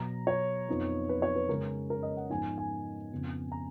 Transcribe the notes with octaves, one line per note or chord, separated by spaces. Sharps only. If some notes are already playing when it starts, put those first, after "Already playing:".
Already playing: B2 F#3 B3 A#5
C#5
F2 F3 B3 D#4
B4
C#5
B4
C#3 G#3 C#4 A#4
A#4
D#5
F#5
G#2 F3 B3 D#4 G#5
G#5
F2 C#3 F3 B3
A#5